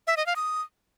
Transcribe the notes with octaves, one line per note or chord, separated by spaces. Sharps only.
E5
D#5
F5
D#6